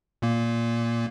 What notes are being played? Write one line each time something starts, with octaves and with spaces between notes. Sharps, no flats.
A#2 A#3